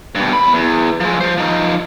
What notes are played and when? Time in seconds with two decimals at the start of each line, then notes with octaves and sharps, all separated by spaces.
0.15 G2 B2
0.33 E2 B5
0.54 E2
1.00 F3 G#3
1.21 F3 C5
1.38 F3 D#4